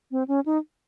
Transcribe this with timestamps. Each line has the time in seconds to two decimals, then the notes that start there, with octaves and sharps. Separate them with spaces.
0.11 C4
0.28 C#4
0.46 D#4